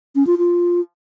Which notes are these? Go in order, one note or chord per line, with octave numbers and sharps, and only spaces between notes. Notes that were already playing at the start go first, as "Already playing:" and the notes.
C#4
F4
F4